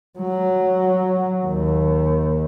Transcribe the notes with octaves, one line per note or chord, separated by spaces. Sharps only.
F#3
D#2